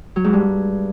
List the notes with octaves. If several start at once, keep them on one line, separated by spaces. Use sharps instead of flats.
F#3
G#2
G2